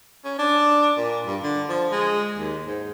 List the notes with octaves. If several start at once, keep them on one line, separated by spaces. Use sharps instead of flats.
C#4
D4
A#2
G2
D3
F3
G#3
D#2
G#2